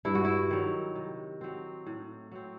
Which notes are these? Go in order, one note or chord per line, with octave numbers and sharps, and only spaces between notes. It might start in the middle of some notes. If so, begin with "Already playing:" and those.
G2 E4
F#4
E4
D#3 F#3
C3
F#3 C4
A2
F#3 C4